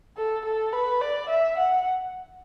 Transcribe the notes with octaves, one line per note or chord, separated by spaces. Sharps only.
A4
A4
B4
D5
E5
F#5